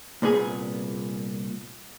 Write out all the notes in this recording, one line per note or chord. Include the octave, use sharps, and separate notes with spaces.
C2 A#2 B3 G#4